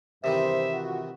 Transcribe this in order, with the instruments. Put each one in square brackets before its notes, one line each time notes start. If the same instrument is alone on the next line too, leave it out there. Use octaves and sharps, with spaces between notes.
[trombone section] E2 G2 C5 [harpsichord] C3 D#3 E3 [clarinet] E5
[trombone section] F4 F#4